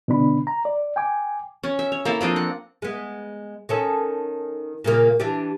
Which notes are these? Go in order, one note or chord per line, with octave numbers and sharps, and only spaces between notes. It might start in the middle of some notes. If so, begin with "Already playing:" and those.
B2 D3 B3 D4 B5
A#5
D5
G5 G#5 D6
C#4
E5
C#5
A#3 E4 A4
F3 C4 D4 D#5
F#5
G#3 B3
D#3 C#4 A4
A#2 C#3 A#3
E3 D4 G4